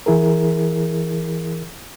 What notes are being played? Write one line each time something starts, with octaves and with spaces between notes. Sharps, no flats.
E3 E4 G#4 A#4